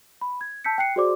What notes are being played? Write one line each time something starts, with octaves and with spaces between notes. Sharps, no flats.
B5
G#6
A5 E6 G6 B6 C#7
G5 F#6 C7 C#7
F#4 G#4 C5 D5 C6 D6